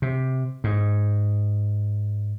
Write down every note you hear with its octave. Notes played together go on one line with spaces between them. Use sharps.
C3
G#2